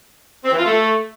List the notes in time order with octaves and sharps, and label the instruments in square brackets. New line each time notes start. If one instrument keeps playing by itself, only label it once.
[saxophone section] C4
E3
F4
A3